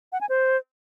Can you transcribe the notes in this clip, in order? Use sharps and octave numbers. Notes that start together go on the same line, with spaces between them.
F#5
G#5
C5